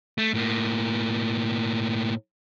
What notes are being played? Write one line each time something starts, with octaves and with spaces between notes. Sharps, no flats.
A3
A2 A#3